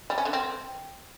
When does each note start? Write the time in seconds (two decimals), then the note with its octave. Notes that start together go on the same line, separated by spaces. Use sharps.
0.10 G3
0.18 C#4
0.25 D3
0.33 C4